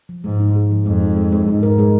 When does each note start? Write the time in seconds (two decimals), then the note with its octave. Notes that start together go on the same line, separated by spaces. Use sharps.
0.09 F3
0.24 G#2 G#3
0.40 D#4
0.55 G#4
0.71 F3
0.86 F2 G#3
1.01 D#4
1.17 G#3
1.32 G#3
1.48 G#2 D#4
1.63 A#4
1.79 G#3